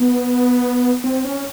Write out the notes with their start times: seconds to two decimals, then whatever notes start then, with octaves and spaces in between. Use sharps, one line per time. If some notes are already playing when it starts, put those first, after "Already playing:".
Already playing: B3
1.04 C4
1.25 C#4